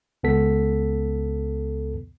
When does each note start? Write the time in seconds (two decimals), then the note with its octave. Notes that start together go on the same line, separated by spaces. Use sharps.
0.23 C#2 B3 A4 B6